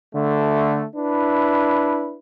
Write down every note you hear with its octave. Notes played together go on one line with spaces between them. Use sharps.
D3 A3
D4 E4 B4